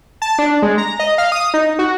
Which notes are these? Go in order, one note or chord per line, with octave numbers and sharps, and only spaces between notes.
A5
D4
G#3
A#5
D#5
F5
D#6
D#4
F#4